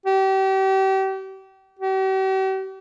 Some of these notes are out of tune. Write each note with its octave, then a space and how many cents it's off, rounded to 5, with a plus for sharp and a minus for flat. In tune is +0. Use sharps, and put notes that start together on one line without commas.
G4 -35
G4 -45